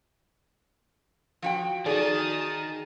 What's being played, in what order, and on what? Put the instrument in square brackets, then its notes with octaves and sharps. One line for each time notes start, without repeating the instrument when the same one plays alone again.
[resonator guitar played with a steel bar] F3 F#4 G5
[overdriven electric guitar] D#3 [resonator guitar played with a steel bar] F#4 D5 [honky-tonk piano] G#4 [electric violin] A5 D#6